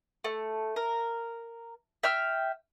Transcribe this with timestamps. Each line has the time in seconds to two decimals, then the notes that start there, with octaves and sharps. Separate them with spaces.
0.24 A3
0.76 A#4
2.03 E5 G5 F6